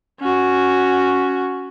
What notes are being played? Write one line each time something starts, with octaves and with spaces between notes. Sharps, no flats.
C#4 F#4